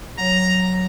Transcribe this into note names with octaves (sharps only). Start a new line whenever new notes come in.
F#3 C#5 A#5